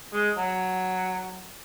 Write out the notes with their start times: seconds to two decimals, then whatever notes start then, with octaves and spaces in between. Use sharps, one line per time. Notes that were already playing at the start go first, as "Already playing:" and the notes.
0.13 G#3
0.37 F#3